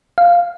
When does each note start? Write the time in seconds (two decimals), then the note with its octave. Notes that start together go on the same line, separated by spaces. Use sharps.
0.18 F5